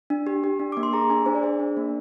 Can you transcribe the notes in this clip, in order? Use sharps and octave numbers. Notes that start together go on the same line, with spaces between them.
D4
G4
G4
D4
A#3 D6
C6
G#4 A#5
D4 G#5
D4 C5
D5
G#4 C5
D4
A#3